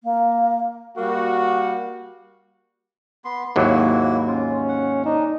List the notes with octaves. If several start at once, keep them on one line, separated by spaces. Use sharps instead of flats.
A#3
G3 A#3 F#4
B3 C6
G#1 D#2 F#3 A#3 E4 F#4
C#4 F4
F#5
D4 D#4